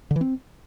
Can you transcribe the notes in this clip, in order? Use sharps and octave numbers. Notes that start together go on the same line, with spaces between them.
D3
E3
C4